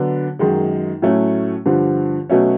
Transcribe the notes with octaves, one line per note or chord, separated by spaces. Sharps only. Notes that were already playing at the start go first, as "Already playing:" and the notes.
Already playing: D3 F#3 B3 D4
F#2 D#3 G#3
A2 F#3 A3 C#4
G2 D3 F3
B2 F#3 A3 C#4